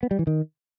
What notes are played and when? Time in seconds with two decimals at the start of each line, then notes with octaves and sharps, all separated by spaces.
0.03 B3
0.11 G3
0.19 E3
0.27 D#3